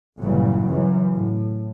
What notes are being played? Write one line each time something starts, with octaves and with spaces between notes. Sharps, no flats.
G1 A#2 C#3 E3 F#3 G3
C#2 F#2 E3
A2